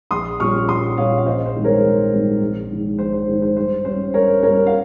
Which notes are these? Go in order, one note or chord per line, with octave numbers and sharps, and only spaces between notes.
A#1 C6 D#6
A#2 G3 C#4 C#6 F6
A#1 C6 D#6
A#2 G3 C#4 C#5 F5
F5
A#1 C5 D#5
C5
G#2 D#3 G3 C4
A#4 C#5
A#1
G#2 D#3 G3 C4
A#1
G#2 D#3
A#1 C5
C5
G#2 D#3
C5
G2 C5
G3 C#4 C5
G2 A#4 C#5
G3 C#4 A#4 C#5
F5